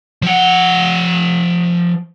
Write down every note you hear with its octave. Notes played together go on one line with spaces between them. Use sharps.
F3 F#5